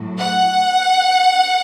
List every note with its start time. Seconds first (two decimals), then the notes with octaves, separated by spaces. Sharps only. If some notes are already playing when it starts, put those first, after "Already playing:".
Already playing: A2 F#3
0.18 F#5